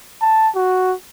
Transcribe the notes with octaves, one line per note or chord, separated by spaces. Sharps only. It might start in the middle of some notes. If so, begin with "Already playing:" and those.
A5
F#4